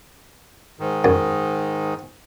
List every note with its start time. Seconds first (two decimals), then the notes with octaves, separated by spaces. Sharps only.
0.80 G#2 D#3
1.04 F#2